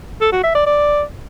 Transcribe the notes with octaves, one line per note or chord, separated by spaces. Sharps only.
A4
F#4
E5
D5
D5